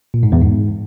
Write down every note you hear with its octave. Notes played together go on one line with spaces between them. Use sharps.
A#2
G#2
E2
G#2